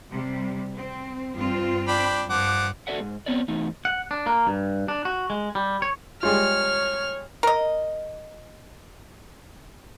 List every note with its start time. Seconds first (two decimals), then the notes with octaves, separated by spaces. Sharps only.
0.11 C3 G3
0.76 C4
1.38 G2 C4 F4
1.88 D4 G5 B5
2.30 G2 F3 F#5 D6
2.87 F#4 A4 D5 E5 F#5
3.00 G#2
3.26 B3 C4 C#5 D5
3.48 E3 A3 D#4
3.85 F#5
4.11 D4
4.27 A#3
4.47 G2
4.88 D4
5.05 F#4
5.30 G#3
5.55 G3
5.82 C#5
6.23 G3 G#3 F4 C#5 F6
7.43 A#4 D#5